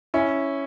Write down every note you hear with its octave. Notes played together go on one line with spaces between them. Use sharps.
C#4 E4